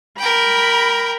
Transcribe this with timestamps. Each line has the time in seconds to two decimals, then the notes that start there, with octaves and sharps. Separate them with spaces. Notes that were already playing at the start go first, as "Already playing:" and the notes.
0.18 A#4 G5 B5